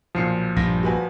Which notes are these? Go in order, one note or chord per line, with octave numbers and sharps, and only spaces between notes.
B1 A#2 F3 C7 C#7
A#1 G2 A#6
F#4 B4 G#5